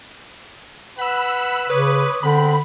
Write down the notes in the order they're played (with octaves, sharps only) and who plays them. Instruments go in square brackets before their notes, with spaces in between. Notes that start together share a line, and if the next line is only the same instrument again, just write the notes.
[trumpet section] B4 F#5 [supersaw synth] B5 E6
[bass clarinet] C#3 [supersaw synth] B4 [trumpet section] C#5 D6 D#6
[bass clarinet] D3 [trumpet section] G#3 B3 C4 [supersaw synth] B5